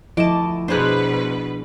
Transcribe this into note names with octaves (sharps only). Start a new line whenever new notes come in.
D2 F3 E4 D#5 A5 D6
B2 D4 G#4 B4 C5 A#5 F#6